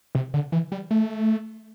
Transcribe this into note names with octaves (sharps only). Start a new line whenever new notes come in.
C3
D3
E3
G3
A3